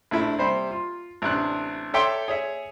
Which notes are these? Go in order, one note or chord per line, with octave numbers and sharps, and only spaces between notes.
A#1 A3 D4 E4
C3 G3 C5 B5
F4
A1 C3 D4 F#6
A4 C#5 E5 G5 C6 D6
G#4 C#5 E5